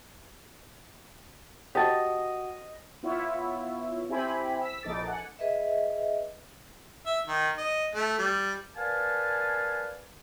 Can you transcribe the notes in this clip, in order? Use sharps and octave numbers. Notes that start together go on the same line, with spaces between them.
F#4 G4 D#5 F#5 A5
B3 E4 F4 C#5 E5
C4 E4 G4 C5 G#5 B5
E6 B6
A#1 E3 D#4 A4 D6 A6
F#5 G#5
G#4 B4 D#5 E5
E5
D#3
D#5
A3
G3
A#4 B4 D5 F5 G#5 A5